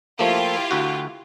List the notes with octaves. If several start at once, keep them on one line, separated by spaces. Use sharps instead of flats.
F3 A3 A#3 E4 F4 G4
D2 F#4